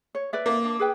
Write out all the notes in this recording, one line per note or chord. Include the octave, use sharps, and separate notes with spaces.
C#5
B4 D5 E5
A#3
D4
G#4 B4 G5